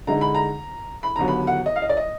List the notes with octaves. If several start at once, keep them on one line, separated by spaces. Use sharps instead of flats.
D3 G#3 D#4 A#5
B5
A#5
B5
D#2 D3 F#3 B3 A#5
B5
F#5
D#5
F5
D#5
D5
D#5